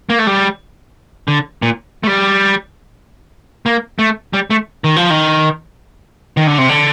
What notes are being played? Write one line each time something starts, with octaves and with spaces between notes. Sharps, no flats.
A#3
A3
G3
D3
A#2
A3
G3
A#3
A3
G3
A3
D#3
F3
D#3
D#3
D3
C3
D3